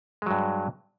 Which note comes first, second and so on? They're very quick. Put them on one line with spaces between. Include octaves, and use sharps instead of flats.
G#3 F#3 G2